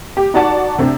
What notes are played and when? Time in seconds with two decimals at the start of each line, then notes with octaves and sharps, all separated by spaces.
0.17 G4
0.34 D#4 F#4 D5 F#5 A5
0.78 C3 C4 D4